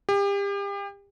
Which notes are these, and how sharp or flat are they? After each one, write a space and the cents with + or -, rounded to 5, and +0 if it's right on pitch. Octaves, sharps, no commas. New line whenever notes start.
G4 +35